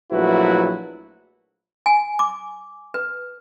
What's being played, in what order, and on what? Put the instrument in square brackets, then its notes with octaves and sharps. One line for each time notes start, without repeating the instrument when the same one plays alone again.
[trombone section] A#1 F#3 A3 E4 F#4 B4
[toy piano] G#5
D6
B4